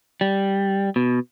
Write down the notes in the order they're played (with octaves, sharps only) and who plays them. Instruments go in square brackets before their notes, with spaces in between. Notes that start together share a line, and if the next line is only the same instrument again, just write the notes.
[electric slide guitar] G3
B2